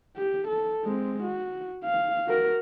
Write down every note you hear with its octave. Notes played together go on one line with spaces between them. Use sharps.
G4
A4
G#3 C4
F#4
F5
F#4 A#4